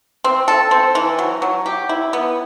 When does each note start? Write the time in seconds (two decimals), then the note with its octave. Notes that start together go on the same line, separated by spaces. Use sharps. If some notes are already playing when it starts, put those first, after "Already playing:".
0.24 C4
0.48 A4
0.71 C4
0.95 E3
1.19 F#3
1.42 F#3
1.66 G4
1.89 E4
2.13 B3